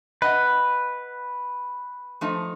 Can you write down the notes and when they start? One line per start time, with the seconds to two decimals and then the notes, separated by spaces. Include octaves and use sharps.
0.22 B4 D#5 F#5
2.21 F3 A3 D#4